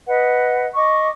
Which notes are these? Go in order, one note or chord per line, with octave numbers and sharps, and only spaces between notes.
B4 D#5 F#5
D#5 C#6 D6